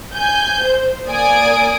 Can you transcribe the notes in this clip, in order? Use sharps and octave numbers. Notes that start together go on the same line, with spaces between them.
G#5 G6
C5
A#3 D5 G#5 D#6 D7